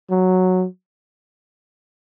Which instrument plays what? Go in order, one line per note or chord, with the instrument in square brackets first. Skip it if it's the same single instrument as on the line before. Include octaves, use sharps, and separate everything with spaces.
[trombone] F#3